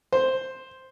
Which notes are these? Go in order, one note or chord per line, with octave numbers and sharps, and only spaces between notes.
C5